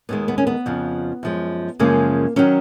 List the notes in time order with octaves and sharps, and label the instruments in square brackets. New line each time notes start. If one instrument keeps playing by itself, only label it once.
[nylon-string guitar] D#2 D#3 G#3 B3
B3
C#4
B3
F2 C#3 F3
F#2 F3 G#3
F#2 C#3 F3 G#3 A#3
D#3 F#3 C#4